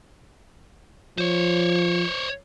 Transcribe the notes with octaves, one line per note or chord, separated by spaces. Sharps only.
F3 C5 C#5